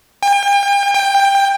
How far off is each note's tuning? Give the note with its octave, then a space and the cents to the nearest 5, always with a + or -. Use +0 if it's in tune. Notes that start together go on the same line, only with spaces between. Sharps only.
G5 +40
G5 +15